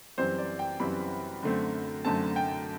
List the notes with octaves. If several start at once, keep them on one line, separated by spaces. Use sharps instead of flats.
F#2 E3 G3 C4 C5
D5
G5
F#2 E3 G3 C4 B5
F#2 D3 A3 C4
F#2 D3 A3 C4 A5
G5